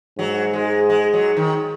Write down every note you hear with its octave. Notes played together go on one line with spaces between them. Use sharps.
G#2 F#3
G#3
G#3
F#3
D#3